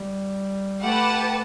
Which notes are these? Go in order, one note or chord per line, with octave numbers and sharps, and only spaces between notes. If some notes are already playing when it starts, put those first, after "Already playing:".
Already playing: G3
A3 G4 B4 F#5 A5